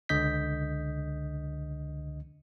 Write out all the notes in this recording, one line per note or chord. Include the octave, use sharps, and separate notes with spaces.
C#2 D3 D#5 G6 B6